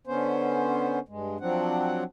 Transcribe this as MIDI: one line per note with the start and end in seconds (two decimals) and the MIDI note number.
0.07 0.99 50
0.07 0.99 59
0.07 0.99 61
0.07 0.99 72
1.08 1.37 43
1.08 1.37 56
1.40 2.04 53
1.40 2.04 54
1.40 2.04 60
1.40 2.04 62
1.40 2.04 78